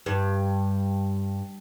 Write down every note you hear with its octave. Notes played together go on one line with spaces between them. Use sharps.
G2